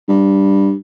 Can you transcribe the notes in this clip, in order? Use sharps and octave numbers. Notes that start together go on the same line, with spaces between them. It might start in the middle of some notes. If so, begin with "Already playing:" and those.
G2